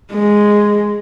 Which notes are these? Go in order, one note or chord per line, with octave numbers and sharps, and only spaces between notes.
G#3